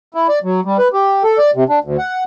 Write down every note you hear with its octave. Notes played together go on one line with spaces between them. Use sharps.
E4
D5
F#3
G3
B4
G4
A4
D5
C3
D4
D2
F#5